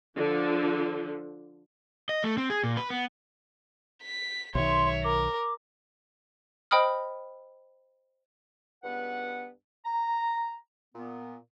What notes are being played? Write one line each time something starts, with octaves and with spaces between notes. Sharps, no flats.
D3 F3
D#5
A3
C4
G#4
A#2
B4
B3
B6
B1 D#3 C#5 E5 C6
A#4 D6
C5 D#5 G5 B5 D#6 F6
C#2 G2 B3 B4 F#5
A#5
A#2 B3